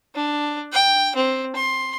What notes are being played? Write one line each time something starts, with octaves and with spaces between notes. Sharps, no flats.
D4
G5
C4
C6